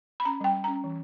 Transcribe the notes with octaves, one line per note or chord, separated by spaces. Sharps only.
B5
C#4 A#5
G3 G5
G3
C#4 A#5
E3